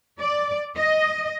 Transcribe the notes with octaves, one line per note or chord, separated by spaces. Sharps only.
D5
D#5